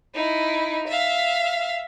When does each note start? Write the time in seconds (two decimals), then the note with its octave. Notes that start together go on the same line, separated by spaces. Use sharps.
0.15 D#4 E4
0.88 E5 F5